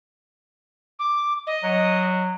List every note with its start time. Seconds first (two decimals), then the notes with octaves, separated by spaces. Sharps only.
0.99 D6
1.47 D#5
1.63 F#3